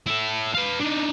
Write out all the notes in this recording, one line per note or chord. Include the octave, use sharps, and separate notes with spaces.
E4 A4
B4 F5
D4 D#4